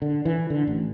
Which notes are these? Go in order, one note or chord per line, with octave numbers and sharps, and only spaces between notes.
D3
E3
D3
A1